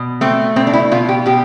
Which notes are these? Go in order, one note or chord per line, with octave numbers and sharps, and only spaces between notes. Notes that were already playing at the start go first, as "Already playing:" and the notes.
Already playing: B2
A3 C4
B2 C4
D4
E4
B2 F4
G4
B2 G4